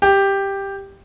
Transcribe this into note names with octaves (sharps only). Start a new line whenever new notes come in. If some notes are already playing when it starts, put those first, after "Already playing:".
G4